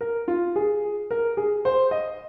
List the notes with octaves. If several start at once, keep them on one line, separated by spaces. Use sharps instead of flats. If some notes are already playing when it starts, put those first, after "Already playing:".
A#4
F4
G#4
A#4
G#4
C5
D#5